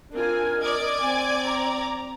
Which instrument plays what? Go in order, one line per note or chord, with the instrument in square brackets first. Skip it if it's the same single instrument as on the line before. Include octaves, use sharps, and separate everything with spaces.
[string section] C4 [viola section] D4 F4 G#5 [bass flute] A#4
[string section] D5 D6 G#6 [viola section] D#5
[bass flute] C4 [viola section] G#5
[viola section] A#5